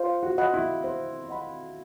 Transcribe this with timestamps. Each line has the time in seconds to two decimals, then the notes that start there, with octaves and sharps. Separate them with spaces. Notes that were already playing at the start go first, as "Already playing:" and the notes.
Already playing: F4 C5
0.23 F#4
0.38 D#5 F#5 B5
0.54 E4
0.84 C5
1.29 D#5 F#5 B5